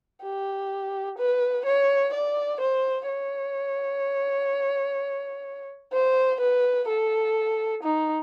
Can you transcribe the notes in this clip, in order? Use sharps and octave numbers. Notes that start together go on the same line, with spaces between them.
G4
B4
C#5
D5
C5
C#5
C5
B4
A4
D#4